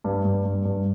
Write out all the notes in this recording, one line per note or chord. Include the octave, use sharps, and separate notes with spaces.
G2
G2
G2
G2